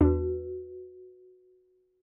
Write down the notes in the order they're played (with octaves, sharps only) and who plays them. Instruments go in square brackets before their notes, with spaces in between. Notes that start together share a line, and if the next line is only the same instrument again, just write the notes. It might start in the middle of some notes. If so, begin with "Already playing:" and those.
[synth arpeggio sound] E2 D4 [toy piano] F#4 B4